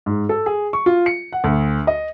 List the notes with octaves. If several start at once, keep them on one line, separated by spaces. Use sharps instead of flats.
G#2
A4
G#4
C#6
F4
C#7
F#5
D2
D#5